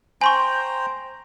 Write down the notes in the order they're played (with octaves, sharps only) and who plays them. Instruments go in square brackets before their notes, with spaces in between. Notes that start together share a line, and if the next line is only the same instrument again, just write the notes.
[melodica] C5 G5 A#5 [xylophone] G#5 C6 C#6